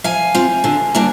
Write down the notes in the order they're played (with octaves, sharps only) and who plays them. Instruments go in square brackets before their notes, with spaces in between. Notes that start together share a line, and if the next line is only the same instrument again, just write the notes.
[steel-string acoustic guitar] F3 F5 G#5
C4 F4
D3
G3 A#3 D4